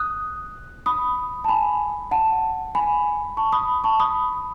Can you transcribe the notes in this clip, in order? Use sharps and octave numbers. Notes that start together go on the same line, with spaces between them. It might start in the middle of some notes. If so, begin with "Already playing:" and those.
Already playing: D#6 F#6
B5 D#6
A5
G#5 B5
F#5 A5
G#5 B5
A5 C#6
B5 D#6
A5 C#6
B5 D#6